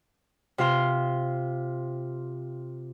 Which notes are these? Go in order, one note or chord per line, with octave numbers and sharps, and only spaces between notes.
C3 F4 F5 C6